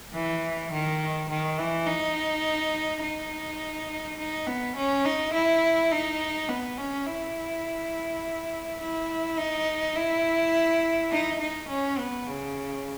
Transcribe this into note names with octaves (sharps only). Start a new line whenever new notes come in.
E3
D#3
D#3
E3
D#4
D#4
D#4
B3
C#4
D#4
E4
D#4
B3
C#4
E4
E4
D#4
E4
D#4
D#4
C#4
B3
C#3